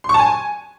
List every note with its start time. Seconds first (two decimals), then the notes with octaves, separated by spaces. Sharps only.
0.04 C6
0.09 C#6
0.14 A5
0.19 G#5